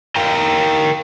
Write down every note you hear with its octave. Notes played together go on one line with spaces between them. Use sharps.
A#4 F5 G5 A#5